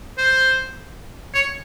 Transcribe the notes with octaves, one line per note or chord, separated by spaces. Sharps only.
C5
C#5